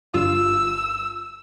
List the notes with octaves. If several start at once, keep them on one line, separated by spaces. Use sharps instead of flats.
G1 G2 F4 E6